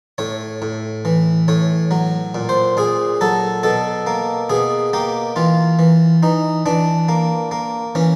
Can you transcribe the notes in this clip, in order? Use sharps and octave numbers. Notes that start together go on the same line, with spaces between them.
A2 C#5
A2
E3
A2 C#5
F#3
A#2
C5
A#2 G#4
F#3 A4
B2 A4
A#3
B2 G#4
A#3 G4
E3 F4
E3
E3 D#4
E3 D4
A#3
A#3
E3 C#4